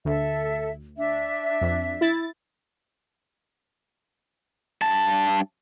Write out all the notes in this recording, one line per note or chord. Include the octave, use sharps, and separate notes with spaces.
D2 A4 E5
D4 E5
F2
E4 A6
G2 A5